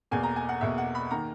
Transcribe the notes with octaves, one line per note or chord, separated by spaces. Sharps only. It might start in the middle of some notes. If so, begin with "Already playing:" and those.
E2 B2 A#3 G#5
A#5
G#5
F#5
E2 B2 A#3 E5
F#5
B5
D#3 A#3 A#5